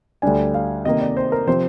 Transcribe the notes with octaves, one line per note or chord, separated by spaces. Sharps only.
D2 D3 G3 D4 G#5
F5
C3 D#3 A#3 D#5
D5
C5
A#4
C3 F3 C4 C5